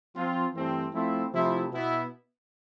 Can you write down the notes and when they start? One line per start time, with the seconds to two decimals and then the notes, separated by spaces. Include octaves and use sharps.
0.15 F3 C4 F4
0.54 G2 E3 A3 C4
0.94 F3 A3 C4 E4
1.33 C3 F3 A3 E4
1.72 B2 B3 E4